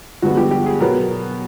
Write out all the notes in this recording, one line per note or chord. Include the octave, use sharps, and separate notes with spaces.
G2 D3 F3 G#3 B3 F#4
G4
G4
G#4
B2 F#3 B3 A#4